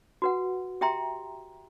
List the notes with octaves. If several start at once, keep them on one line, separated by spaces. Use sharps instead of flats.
F#4 B4 F#5
G4 E5 G5 A#5 C6